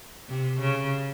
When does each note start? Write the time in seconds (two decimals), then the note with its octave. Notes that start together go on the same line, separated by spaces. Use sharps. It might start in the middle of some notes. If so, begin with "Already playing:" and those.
0.29 C3
0.60 C#3